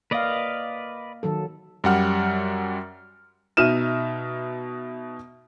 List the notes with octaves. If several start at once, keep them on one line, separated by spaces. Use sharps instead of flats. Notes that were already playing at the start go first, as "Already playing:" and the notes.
A#3 B4 D5 D#5 F5
D#3 F#3 A4
F#2 G3 F#5 F6
B2 D#4 E5 F6 D#7 E7